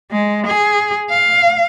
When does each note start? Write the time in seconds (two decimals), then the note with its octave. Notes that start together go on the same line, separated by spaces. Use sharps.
0.11 G#3
0.47 G#4
1.10 F5